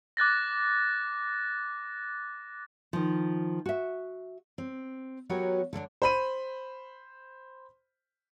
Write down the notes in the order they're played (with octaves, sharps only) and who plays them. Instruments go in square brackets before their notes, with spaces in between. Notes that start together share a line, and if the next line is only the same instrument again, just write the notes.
[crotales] D6 F#6 A6 A#6
[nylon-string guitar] D#3 F3
F#4 E5
[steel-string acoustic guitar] C4
F#3 B3 F#4 G4 A#4 C#5
D3 F#3 C#4 D4
[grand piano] C5 B5 D#7